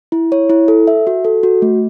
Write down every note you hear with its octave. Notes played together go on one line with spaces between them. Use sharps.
E4
C#5
E4
A4
E5
F#4
A4
F#4
A3